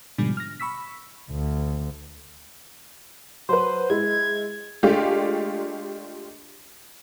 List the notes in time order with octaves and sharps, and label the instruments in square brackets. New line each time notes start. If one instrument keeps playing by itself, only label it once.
[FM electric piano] G#2 B2 D3 F3 G3
F6 A#6
B5 C#6 E6 B6
[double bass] D2
[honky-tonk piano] F#3 B4 [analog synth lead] C5
[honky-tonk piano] G#3 E4 [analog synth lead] G#6
[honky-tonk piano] G#3 A3 D4 F4 G4